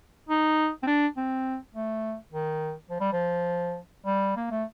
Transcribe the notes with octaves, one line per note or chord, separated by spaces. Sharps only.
D#4
C4
D4
C4
A3
D#3
F3
G3
F3
G3
A#3
A3